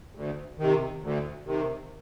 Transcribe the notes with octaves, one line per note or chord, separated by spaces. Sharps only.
D2
C3 D#3
D2
C3 D#3